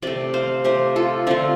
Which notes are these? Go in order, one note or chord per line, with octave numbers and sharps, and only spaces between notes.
C3 A3 D5 G5
C5 F5
C3 A3 G4 C5
F4 A4
D3 A3 C4 F4